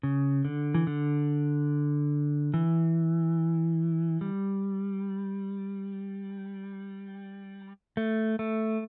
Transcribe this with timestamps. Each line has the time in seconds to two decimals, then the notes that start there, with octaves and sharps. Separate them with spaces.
0.03 C#3
0.45 D3
0.74 E3
0.87 D3
2.54 E3
4.21 G3
7.97 A3
8.39 A3